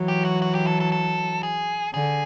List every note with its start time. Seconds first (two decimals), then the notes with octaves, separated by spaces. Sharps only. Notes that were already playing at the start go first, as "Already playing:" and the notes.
Already playing: E3 F#3
0.08 G4
0.25 F#4
0.42 F#4
0.55 G4
0.67 A4
0.80 A4
0.92 A4
1.43 G#4
1.93 D3 G#4